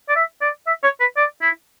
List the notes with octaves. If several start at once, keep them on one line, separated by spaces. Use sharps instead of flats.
D5
E5
D5
E5
C#5
B4
D5
E4